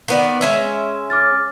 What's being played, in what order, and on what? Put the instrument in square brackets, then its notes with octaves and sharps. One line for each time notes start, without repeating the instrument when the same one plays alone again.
[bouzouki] D#3 B3 D5
G#3 C#4 E5
[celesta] D6 F6 A6